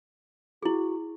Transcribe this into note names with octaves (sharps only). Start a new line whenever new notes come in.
E4 F#4 G#4